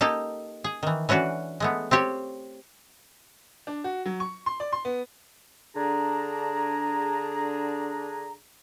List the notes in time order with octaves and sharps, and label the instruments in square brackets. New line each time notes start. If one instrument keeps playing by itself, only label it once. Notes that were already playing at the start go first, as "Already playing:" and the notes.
[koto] A#3 D#4 G4 A4
G#4
D#3 E3
E3 C#4 D4 F#4 A4
G#3 A3 B3
C4 F4 G4 C#5
[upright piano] D4
F#4
F#3
C#6
C6
D5
C6
B3
[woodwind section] D3 D4 G#4 A#5